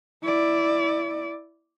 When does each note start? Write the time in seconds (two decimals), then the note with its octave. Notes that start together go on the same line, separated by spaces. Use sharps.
0.24 E4 D5